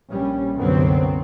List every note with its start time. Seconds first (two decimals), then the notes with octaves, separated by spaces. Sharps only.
0.10 A#1 G3 C#4
0.56 C2 F#2 D3 F#3 B3 C4